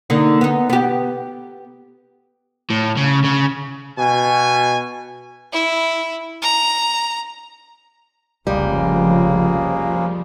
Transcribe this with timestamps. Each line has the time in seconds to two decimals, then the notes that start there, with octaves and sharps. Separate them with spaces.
0.10 D3 A#3 D#4
0.41 B3 D#4
0.70 B3 G4
2.70 A2
2.97 C#3
3.25 C#3
3.99 B2 G#5
5.52 E4
6.42 A#5
8.47 F1 C#2 C#3 F3 G3 G#3 A#3